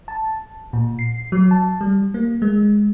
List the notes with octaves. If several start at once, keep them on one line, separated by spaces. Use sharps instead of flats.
A5
A#2
C7
F#3
A5
G3
A#3
G#3